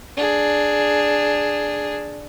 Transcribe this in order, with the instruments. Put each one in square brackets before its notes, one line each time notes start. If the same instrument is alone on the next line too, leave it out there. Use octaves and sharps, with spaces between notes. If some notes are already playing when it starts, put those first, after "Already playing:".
[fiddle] D4 G#4